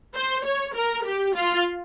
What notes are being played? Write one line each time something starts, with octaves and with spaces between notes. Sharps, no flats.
C5
C#5
A#4
G4
F4